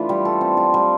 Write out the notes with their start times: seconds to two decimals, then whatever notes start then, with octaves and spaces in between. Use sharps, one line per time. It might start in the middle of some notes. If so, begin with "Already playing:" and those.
Already playing: E3 A3 D4 F4
0.09 G3
0.25 A4
0.41 C4
0.57 F4
0.74 G3